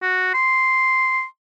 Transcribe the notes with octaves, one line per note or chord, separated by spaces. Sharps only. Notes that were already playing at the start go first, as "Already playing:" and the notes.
F#4
C6